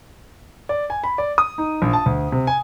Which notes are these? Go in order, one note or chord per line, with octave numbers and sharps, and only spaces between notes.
D5
G#5
B5
D5
D#6
D#4
A#1
A5
D2
C3
G#5